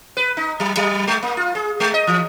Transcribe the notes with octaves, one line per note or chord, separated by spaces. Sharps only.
B4
D#4
F#3
F#3
G#3
A#3
F4
G#4
G#3
D#5
E3